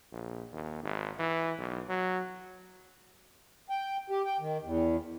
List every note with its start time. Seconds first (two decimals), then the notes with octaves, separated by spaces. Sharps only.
0.12 A#1
0.52 D#2
0.83 G#1
1.19 E3
1.59 B1
1.89 F#3
3.70 G5
4.10 G4
4.25 G5
4.40 D#3
4.64 E2